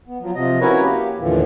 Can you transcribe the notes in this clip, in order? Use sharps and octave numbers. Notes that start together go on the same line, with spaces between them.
B3
F3 F#3
C3 F3 D#5
C#4 E4 F#4 A#4 B4 C#5
A#3 G4
D#2 A2 D3 E3 F3